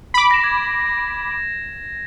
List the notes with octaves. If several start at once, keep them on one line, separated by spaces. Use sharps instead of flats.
B5 D6
A#6 E7
G#6